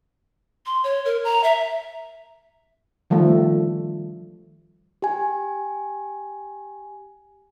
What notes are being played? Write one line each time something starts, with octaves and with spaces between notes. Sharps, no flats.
C6
C#5
A#4
A#5
E5
D#3 F3 G3 A3
G4 G#5